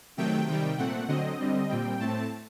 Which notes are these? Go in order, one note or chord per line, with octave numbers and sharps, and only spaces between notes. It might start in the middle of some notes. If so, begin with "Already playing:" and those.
C3 D#3 F#3 A3 G5
C3 D#3 G3 G5
A#2 A3 C4 F#5
D3 F#3 C4 D#5
D3 G3 C4
A#2 G3 C4 G5
A2 A3 C4 A5